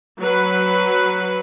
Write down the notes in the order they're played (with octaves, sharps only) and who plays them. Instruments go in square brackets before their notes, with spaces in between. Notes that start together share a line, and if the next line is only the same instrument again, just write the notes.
[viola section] F#3 B4